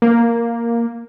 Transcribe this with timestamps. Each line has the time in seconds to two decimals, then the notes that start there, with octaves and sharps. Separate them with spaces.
0.02 A#3